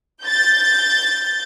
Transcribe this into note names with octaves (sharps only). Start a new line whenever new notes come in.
G6 A6